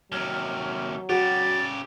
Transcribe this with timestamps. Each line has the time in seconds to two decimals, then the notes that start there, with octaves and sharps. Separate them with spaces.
0.12 D#2 C3 F#3 F6
1.09 C#3 F#4 G4 A6